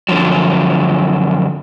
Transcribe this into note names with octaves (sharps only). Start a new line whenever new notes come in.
F#2 A2 D3 F3 F#3